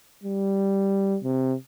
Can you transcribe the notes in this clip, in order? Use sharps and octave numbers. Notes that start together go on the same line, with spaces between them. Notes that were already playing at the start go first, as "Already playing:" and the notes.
G3
C3